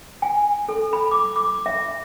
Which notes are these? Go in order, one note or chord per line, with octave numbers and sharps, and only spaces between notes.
G#5
A4
B5
D6
D6
E5